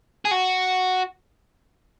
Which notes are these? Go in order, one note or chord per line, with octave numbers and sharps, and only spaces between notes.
G#4
F#4